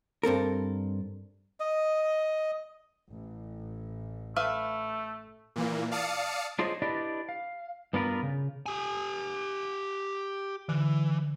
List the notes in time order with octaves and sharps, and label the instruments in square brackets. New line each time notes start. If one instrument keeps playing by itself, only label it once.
[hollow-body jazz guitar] G2 C4 A4 A#4
[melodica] D#5
[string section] A1
[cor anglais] A3 [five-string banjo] B4 E5 F5
[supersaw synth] A#2 E3 A#3
D5 F5 A5 D#6 C#7
[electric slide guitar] D4 F4 G#4 C5 C#5 D#5
D4 E4 G4 B4 D5 D#5
F5
G2 B3 D4 F4 A#4 B4
C#3
[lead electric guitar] G4 G#5
[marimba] D3 [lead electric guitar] E3